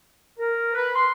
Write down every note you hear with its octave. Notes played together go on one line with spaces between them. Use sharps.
A#4
B4
C6